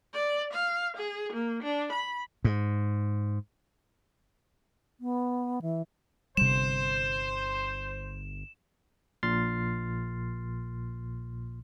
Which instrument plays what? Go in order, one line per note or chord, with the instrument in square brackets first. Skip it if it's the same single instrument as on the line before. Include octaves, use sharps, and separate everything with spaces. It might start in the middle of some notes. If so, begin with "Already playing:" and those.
[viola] D5
F5
G#4
A#3
D4
B5
[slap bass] G#2
[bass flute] B3
E3
[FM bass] G1 [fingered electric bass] C3 G3 [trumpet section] C5 [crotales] E7
[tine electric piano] A#1 A#2 C6 F6 A6 C7